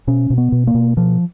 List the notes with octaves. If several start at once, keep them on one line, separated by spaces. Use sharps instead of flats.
B2 C#4
B2
B3
B2
A#3
B2
B2 F3